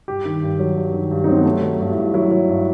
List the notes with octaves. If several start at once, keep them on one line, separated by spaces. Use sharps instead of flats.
G2 G4
D#3
G2
F#3
G2
D#3
G2
D#4
F#3 C4
B3
F#3 A3
F#3
G2
E4
G2
F#3 E4
F#3
G2